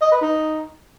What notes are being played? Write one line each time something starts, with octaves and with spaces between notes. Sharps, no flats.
D#5
B4
D#4